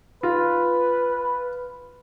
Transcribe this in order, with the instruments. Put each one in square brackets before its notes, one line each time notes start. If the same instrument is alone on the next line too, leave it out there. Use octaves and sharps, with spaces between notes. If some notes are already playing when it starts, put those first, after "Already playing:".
[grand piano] F4 [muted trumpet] B4